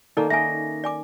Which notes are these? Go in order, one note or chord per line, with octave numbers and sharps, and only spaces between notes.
D#3 A#3 C#4 D#4 A4 D5
A#3 D#5 E5 G#5 A#6
D5 G#5 D6